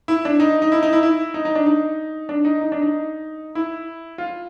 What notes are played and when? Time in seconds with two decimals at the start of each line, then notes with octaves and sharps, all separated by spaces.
0.08 E4
0.25 D4
0.40 D#4
0.62 D#4
0.72 E4
0.83 D#4
0.93 E4
1.03 E4
1.34 D#4
1.45 D#4
1.55 D4
1.66 D#4
2.29 D4
2.45 D#4
2.61 D#4
2.72 D4
2.82 D#4
3.55 E4
4.18 F4